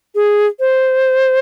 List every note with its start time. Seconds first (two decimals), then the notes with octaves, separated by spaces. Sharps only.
0.15 G#4
0.60 C5